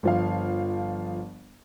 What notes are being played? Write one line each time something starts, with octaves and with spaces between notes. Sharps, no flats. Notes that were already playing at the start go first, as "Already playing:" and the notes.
G1 F3 F5